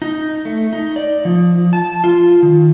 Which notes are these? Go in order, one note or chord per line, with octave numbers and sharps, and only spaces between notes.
D#4
A3
D#4
D5
F3
A5
F4
D#3